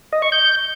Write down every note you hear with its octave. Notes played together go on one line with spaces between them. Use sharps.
D#5
C#6
G6